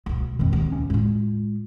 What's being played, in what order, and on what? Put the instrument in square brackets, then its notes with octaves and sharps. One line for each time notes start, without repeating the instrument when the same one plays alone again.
[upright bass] D2 B2
[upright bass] F2 A#2 [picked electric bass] D#3 G#3 C4
[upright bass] D#2
[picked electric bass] D#1 C#2 C#4
[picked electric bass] A2 [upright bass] G#3 F4